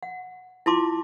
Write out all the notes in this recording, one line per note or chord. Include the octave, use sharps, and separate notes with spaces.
F#5
E4 F4 A5 C6 D6